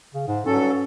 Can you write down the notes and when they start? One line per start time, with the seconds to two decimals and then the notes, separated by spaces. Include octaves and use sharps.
0.14 C#3
0.28 G#2
0.46 G2 F#3 C#4 A4